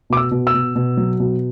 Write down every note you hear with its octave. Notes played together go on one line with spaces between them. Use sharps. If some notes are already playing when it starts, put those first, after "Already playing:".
B2 D6
E6
B2
E6
B2
B2
F#3
B2